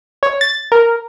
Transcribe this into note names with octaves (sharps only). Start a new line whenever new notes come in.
C#5
A6
A#4